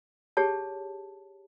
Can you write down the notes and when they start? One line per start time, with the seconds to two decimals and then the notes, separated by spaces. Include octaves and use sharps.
0.37 G4 G#4 C#5 A5